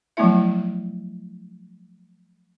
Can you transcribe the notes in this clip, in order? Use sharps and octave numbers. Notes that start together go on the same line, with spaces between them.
F3 F#3 A3 B3 E4 E5